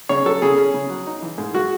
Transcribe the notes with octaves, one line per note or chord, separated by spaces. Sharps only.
C#3 C#5
F#3 A4
C#3 G#4
C#4
C#3
F#3
D#4
E3
G#2
G#3 F#4